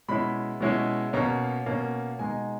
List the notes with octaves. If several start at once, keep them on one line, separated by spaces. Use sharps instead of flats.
B2 G#3 C#4 E4 B5
B2 G#3 C#4 E4
B2 A#3 C#4 A#5
B2 A#3 C#4
B2 G#3 D#4 G#5